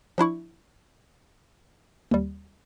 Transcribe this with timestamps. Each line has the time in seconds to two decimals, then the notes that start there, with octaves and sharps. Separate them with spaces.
0.18 F3 D4 E4 C#6
2.11 D#2 G3